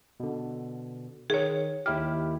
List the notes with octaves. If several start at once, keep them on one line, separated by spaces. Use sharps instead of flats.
B2 D3
D#3 G#4 C#5
D#2 E4 G4 F6